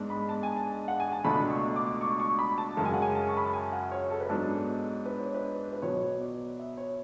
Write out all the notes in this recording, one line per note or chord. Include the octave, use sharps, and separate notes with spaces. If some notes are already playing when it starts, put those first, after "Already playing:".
Already playing: G#2 G#3 B3 D4
B5
A5
G#5
A5
F#5
G#5
A5
C#2 B2 A3 D4 B5
C#6
D6
C#6
C#6
B5
A5
F#2 C#3 G#3 A5
G#5
F#5
G#5
A5
C#6
B5
A5
G#5
F#5
C#5
A4
B4
G#2 F#3 B3 D4 A4
B4
C#5
B4
B4
B2 F#3 B3 C#5
D5
E5
C#5